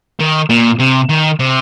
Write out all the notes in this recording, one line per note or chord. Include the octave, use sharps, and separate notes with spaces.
D#3
A#2
C3
D#3
C3